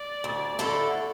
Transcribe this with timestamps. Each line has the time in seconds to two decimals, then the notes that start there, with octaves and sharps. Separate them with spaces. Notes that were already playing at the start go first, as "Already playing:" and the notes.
Already playing: D5
0.24 D2
0.59 D3 A3 E4 A4